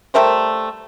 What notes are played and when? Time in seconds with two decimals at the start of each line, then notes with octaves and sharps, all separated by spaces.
0.14 G3 A3 A#4 C5